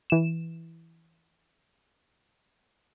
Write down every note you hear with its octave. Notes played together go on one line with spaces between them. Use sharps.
E3 E7